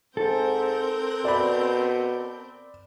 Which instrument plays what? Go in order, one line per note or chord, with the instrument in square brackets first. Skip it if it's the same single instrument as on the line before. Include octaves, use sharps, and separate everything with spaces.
[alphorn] G#2 [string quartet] C4 A#4 G6 [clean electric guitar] A4
[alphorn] B2 [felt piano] D5 B5